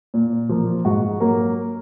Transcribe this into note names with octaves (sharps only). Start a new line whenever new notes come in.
A#2
F3 A#3
G#2 F#4
F#3 A#3 A#4